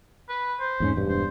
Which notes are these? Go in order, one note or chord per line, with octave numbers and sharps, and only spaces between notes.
B4
C5
E2 G#2 C#4
E1 G2
C5